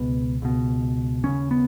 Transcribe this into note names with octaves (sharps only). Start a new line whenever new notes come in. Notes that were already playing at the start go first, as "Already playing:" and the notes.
Already playing: C#2 B2 B3
C#2 B2
D#2 C#3 C#4
B3